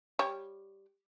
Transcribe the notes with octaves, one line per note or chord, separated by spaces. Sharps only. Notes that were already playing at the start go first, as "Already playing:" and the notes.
G3 C#5